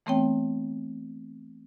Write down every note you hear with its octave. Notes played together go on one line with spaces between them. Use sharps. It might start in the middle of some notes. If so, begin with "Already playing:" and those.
E3 A3 B3 C4 C#5 G5